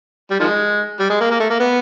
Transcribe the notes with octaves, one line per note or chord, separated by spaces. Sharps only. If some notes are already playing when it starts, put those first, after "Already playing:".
G3
D#3 F3 G#3
G3
G#3
A#3
A#3
A3
A#3
B3